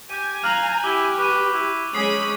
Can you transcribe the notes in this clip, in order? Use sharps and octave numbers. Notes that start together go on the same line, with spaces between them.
G4 G#5 G6 D#7
F5 A#5 F6 F#6 F#7
E4 G4 D6 G7
B4 C#6 D6 D#7
E4 F#6
G#3 C#4 B5 D#6 C7